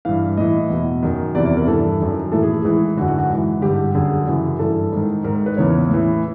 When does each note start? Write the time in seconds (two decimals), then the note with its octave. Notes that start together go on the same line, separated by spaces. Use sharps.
0.05 G2 E3 F5
0.37 A2 E3 D#5
0.70 E2 B2
1.03 F#2 D#3
1.35 E2 C3 E3 D5
1.46 D5
1.57 A#4
1.67 G2 E3 A4
2.00 F#2 D#3
2.32 A2 E3 A4
2.43 G#4
2.54 G#4
2.65 G#2 E3
2.97 D3 F#4
3.01 F#2
3.08 F#4
3.18 F#4
3.29 G#2 E3
3.62 G2 D3 G4
3.94 F#2 D3 G#4
4.27 F#2 C#3 E3
4.59 G2 E3 A4
4.92 G#2 D#3
5.24 G#2 D#3 A#4
5.46 B4
5.57 E2 C#3 E3 C#5
5.90 A2 E3